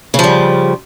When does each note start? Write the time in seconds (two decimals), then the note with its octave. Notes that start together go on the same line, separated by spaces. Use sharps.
0.14 C#3
0.19 F3
0.24 G3